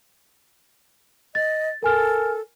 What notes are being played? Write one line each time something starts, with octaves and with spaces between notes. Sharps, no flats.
D#5 A6
A4 A#4 G#5 F6